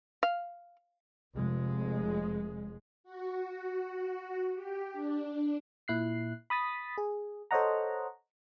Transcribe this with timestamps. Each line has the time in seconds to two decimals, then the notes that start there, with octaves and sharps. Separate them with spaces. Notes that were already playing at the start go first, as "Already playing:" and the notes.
0.23 F5
1.35 F1 G#3
3.04 F#4
4.54 G4
4.93 D4
5.88 A#2 E4 F#6 C7
6.50 B5 D#6 A6 B6
6.98 G#4
7.51 A4 C5 C#5 D#5 F#5 A#5